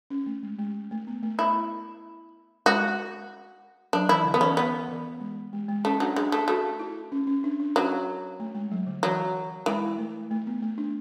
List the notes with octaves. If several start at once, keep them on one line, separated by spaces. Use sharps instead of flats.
C#4
A3
G#3
G#3
A3
B3
A3
E4
G#3 F#4
F#3 D4
E3 E4
D3
B3
E3 C#4
B3
E3
G#3
G#3
G#3
A3 C#4
F#3 D4
G#3 D4
A3
A3 F#4
E4
C#4
C#4
D4
D4
F#3 C#4
A3
G#3
F#3
D3
E3 F#3
E3 G#3
A3
A3
B3
A3
D4